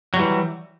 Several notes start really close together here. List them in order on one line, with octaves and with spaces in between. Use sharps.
F#3 G3 E3